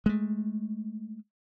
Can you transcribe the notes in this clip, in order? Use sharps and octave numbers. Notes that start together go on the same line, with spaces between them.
G#3 A3